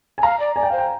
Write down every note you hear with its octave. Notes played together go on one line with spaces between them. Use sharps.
G#5
F5 A#5
D5
D5 G#5
G5
C5 F5
G5